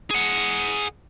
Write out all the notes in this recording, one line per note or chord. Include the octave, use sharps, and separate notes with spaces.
G#4 F#5